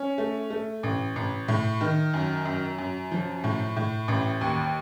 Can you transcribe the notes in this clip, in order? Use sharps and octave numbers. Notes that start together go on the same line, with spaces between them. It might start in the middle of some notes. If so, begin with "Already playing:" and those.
Already playing: C#4
A3
A3
A1
A1
A2
D#3
F#2
F#2
F#2
F3
A2
A2
A1
D#2